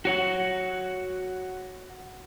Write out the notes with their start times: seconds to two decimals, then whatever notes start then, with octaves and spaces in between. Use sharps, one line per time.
0.05 F#4 C#5 F#5